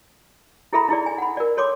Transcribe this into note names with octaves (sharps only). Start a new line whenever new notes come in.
E4 G#4 A4 E5 A#5 B5
D#4 E4 G#4 D5
G#5
F#5 B5
A#4 D5
A4 C#5 C6 D6